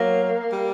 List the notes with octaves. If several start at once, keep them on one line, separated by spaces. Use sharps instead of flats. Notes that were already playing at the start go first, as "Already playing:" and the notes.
Already playing: F#3 A#3
G3